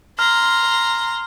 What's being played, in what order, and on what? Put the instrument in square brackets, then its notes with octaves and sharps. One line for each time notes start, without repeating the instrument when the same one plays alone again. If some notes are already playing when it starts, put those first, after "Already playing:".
[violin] A#5 C6 [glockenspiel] F6